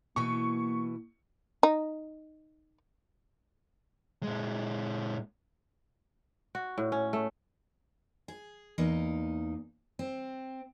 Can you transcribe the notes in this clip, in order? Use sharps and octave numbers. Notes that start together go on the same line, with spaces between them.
B2 E3 A#3 C#6
D#4
A#2 G#3
F#4
A2
C#4
A3
G#4
E2 A#3 D#4
C4